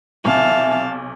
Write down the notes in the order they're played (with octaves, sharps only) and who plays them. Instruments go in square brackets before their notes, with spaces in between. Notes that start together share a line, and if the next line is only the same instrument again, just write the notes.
[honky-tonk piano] B1 C3 [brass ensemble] E5 G#5 [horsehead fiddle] F5 A5